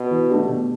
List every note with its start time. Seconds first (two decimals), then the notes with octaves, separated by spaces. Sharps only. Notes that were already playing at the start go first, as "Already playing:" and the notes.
Already playing: B2
0.11 E3
0.30 A3 D4 G4
0.49 B2